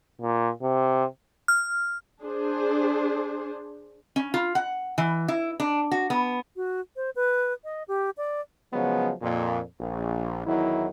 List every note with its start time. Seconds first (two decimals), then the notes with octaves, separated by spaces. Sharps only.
0.21 A#2
0.62 C3
1.48 F6
2.22 D4 G#4 C5
4.16 C#4
4.34 F4
4.55 F#5
4.98 E3
5.28 E4
5.60 D4
5.92 F#4
6.10 B3
6.56 F#4
6.96 C5
7.16 B4
7.64 D#5
7.88 G4
8.17 D5
8.73 C#3 F3 F#3 G#3 B3
9.22 F2 A#2
9.80 A#1
10.47 E2 D#3 F#3 E4